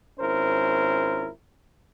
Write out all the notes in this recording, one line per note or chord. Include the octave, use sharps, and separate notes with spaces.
G#1 C#4 E4 A#4 C5